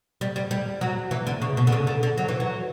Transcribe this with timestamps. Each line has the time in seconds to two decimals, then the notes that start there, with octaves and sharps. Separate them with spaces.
0.21 G3
0.36 G3
0.51 G3
0.81 F#3
1.11 E3
1.27 D3
1.42 C#3
1.57 B2
1.67 D3
1.72 C#3
1.87 D3
2.03 D3
2.18 F#3
2.28 E3
2.40 F#3